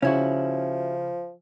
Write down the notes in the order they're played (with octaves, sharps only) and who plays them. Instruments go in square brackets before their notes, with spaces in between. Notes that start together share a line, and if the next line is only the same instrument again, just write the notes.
[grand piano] C#3 [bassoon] F3 [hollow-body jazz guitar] C#4 E4 F#4